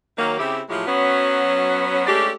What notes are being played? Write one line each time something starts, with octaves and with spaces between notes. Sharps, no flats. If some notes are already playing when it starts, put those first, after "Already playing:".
D#3 F#3 A#3
C#3 C4 E4 G4
A2 F3 F#3 G#3 E4 G4
F#3 B3 C#4
G#3 A3 C#4 D4 G4